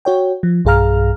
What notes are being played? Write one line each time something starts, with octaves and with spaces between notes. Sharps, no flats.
F#4 C#5 G5
F3
B1 G2 G#4 F5 A#5 F6